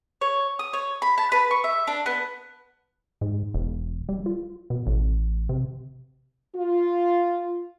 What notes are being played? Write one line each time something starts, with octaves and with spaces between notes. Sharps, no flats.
C#5
D#6
C#5
B5
A5
B4
C#6
E5
D4
B3
G#2
E1
G3
F4
B2
A1
C3
F4